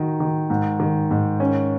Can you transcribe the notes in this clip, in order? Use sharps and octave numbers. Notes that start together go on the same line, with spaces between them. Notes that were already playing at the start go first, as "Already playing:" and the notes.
Already playing: D#3 D#4 F#4
D#3
G#2
D#3
G#2
C#4